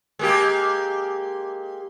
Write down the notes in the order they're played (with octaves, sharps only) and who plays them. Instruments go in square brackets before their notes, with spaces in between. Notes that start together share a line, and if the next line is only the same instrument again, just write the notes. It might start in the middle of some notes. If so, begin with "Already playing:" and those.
[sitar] G#3 A#3 G4